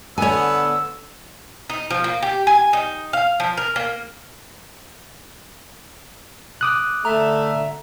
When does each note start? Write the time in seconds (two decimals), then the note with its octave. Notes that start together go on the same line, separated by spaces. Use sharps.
0.18 D3 B3 C#5 G#5 E6
1.70 D#4
1.90 F3
2.04 A#3
2.22 G4
2.47 G#5
2.73 D#4
3.13 F5
3.40 F3
3.57 A#4
3.76 A#3
6.61 D6 D#6 F#6
7.05 D3 A3 E5 A#5